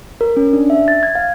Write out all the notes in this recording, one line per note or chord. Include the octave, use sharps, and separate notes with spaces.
A#4
C#4
D4
E5
A6
G#6
F5